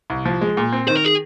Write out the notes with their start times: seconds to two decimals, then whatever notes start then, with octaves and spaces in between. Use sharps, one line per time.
0.10 C2
0.26 F3
0.41 G#3
0.57 A#2
0.72 C4
0.88 D#3 C5
0.97 A#4
1.05 G#4